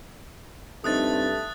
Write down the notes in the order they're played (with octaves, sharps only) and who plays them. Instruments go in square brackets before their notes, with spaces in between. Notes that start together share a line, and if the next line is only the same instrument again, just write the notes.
[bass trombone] G2 [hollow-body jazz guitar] F3 C4 D#4 [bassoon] A3 [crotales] D#6 F#6 A6